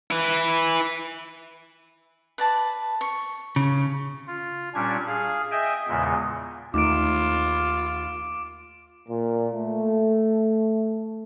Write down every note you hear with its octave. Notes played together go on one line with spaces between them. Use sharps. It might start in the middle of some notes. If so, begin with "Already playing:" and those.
E4 B4
B4 D5 A5
C#6
C#3
F4
A#2 G3 C#4 D4 G#6
G#4 F5
D#5 E5 G5 G#5
E2 A#2 C#3 G#3
D#2 A3 D#4 F4 D6 D7
A#2
A3